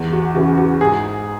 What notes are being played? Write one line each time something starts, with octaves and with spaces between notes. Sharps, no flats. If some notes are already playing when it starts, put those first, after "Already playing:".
Already playing: E2
F#4
C#3 E3 F#4
F#4
G#2 G#4